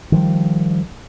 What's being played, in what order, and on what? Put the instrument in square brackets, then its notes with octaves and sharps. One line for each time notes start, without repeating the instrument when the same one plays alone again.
[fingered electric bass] D#3 F3 G3